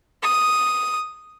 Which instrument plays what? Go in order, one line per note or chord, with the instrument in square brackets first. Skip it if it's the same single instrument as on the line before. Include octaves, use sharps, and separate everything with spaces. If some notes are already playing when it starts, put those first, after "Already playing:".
[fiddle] D#6